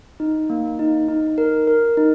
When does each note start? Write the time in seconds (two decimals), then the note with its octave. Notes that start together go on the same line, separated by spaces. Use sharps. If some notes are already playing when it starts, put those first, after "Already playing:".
0.20 D#4
0.50 A#3
0.79 D#4
1.09 D#4
1.38 A#4
1.67 A#4
1.97 D#4